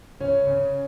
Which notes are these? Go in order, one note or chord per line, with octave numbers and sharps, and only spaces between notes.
C#3 C#4 C#5
C#3